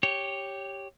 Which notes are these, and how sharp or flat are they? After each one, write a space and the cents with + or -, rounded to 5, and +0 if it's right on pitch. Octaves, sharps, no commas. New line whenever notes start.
G4 +0 C#5 +0